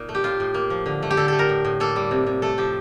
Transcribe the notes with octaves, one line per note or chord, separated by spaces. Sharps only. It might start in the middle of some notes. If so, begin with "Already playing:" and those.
Already playing: A#2 D#4
A3
G4
A2 F4
A2
A#3
F3
D3
A3
G4
D3 A4
A3 A4
A#4
A2
A2
A#3 A4
G3
C3
C3
A3 A4
F3 G4